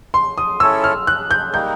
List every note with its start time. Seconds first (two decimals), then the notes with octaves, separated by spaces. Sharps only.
0.14 C6
0.38 D#6
0.60 C#4 E4 A4 C#5 E6
0.84 F6
1.07 F#6
1.31 G6
1.54 G3 A#3 D#4 G6